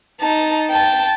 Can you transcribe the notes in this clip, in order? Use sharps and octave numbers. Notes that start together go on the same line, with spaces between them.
D#4 A5
G5 A5